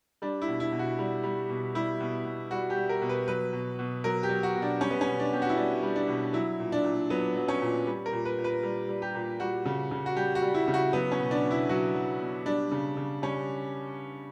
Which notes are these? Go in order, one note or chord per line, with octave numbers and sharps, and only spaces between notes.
G3 D4
E4
B2
E4
B2
F#4
G3
G3
B2
G3 E4
B2
B2
G3 F#4
G4
G3
A#4
B2
B4
F#3 B4
B2
B2
F#3 A#4
G4
F#3
F#4
B2
D4
G3 C#4
B3
C#4
B2
D4
B2 G4
F#4
E4
G3 D4
G3
D4
B2
F#3 E4
A#2
D4
A#2
F#3 B3
F#3
C#4
A#2
G3
A#4
A#2
B4
A#2
B4
G3
G3
G4
A#2
G3 F#4
C#3
C#3
F#4
G3 G4
F#4
G3
E4
C#3
F#4
F#3 B3
C#4
B2
D4
B2
E4
F#3 F#4
F#3
B2
G3 D4
C#3
C#3
G3 C#4